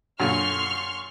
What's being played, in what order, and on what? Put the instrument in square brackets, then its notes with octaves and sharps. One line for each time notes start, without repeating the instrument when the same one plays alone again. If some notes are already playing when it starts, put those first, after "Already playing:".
[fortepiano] F#2 A#2 D3 [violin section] C6 C#6 F6